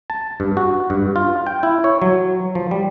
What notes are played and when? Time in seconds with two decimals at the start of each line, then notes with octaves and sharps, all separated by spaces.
0.10 A5
0.40 G2
0.57 F#4
0.90 G2
1.16 F4
1.47 G5
1.63 E4
1.84 C#5
2.02 F#3
2.55 F3
2.71 G3